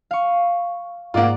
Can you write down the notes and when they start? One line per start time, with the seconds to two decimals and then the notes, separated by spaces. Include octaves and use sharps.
0.11 F5 C#6
1.14 G#2 A#3 F4 D5 F#5